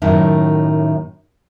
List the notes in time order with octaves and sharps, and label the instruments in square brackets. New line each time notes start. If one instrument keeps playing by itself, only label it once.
[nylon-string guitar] F#2 A2 D#3 A3